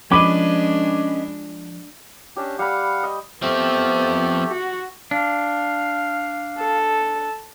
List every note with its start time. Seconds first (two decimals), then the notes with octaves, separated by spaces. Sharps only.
0.11 F3 G#3 C#4 D4 B4 D#5 B5 D6
2.36 C#4 D4 G4 E5
2.59 G3 F5 F#5 B5
3.03 D#5
3.42 F3 A3 B3 C4 G4
4.49 F#4
5.11 D4 F5
6.58 A4